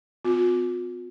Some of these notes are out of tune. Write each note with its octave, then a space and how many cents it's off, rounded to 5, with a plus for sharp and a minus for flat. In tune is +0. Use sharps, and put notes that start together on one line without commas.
B3 +45 F4 +45